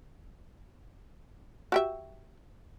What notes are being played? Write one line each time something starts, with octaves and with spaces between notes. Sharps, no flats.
F#4 G4 E5